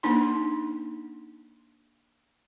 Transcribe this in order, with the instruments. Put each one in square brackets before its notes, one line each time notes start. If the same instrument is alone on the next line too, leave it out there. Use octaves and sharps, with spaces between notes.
[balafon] A#3 D4 D#4 C6